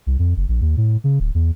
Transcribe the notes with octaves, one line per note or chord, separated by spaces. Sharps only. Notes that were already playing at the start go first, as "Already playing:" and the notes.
C2
F2
F#1
A#1
D#2
A2
C#3
D1
E2